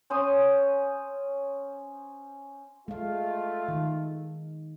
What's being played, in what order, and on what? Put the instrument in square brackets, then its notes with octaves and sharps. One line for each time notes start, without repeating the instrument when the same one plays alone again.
[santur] C#4 C5 C6 D#6
[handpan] G#3 F5 [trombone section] A3 F4
[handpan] D#3